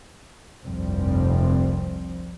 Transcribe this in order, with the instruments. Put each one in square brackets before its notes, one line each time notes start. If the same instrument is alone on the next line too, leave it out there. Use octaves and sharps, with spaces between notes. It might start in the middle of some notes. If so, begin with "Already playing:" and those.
[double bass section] F1 C2 G2 F3 G3 C4